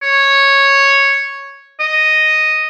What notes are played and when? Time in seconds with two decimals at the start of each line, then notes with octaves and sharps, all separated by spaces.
0.03 C#5
1.80 D#5